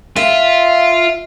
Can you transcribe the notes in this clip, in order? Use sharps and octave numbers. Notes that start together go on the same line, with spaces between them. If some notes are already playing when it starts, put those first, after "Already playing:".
F4 E5